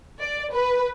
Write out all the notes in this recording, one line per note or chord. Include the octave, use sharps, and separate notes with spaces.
D5
B4